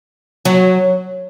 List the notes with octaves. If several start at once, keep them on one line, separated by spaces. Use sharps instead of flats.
F#3